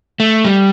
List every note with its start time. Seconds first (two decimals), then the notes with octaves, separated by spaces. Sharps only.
0.20 A3
0.45 G3